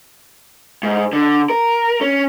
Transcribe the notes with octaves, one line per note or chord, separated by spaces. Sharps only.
G#2
D3
A#4
C#4